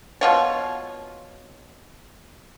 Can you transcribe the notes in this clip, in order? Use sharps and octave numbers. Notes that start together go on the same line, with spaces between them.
B2 F4 C#5